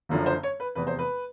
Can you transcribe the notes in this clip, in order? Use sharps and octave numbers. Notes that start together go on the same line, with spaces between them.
F#1 F#2 D3 F3
C5
C#5
B4
F1 E2 C3 B4
C5
B4